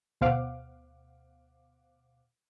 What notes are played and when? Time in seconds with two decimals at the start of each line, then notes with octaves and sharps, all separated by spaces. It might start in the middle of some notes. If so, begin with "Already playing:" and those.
0.21 D2 B2 C5 F5 F#5 D6